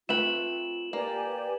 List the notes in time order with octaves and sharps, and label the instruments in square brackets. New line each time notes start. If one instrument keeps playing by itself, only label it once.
[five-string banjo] A3 C4 B4 [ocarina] F4 [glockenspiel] E7 F#7
[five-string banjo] A#3 [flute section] G4 D5 G#5 [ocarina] B4